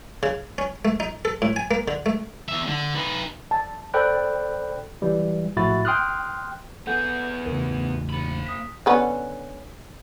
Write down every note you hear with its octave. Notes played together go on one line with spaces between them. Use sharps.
C#3
C#4
A3
D#4
A4
A2
G#5
A#3
D3
A3
E2 E5
D3
D#4 B4
A5
A4 C5 D5 G5 B5 F#6
E3 G3
A#1 A2 F#4 E5 B5 A6
G5 C6 D#6 F6 F#6
B3 G#4 A4 F#5 G6
E2 C#3 A#4
A#3 B5
D#6 B6
D3 B3 C#4